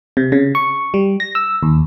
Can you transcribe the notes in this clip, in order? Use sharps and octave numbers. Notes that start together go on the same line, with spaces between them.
C3
C#3
C#6
G3
A#6
E6
D#2